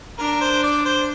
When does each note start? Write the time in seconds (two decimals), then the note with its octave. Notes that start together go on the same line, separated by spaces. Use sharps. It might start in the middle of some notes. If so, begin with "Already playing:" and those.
0.19 D4 A#4
0.41 C5
0.63 D5
0.85 C5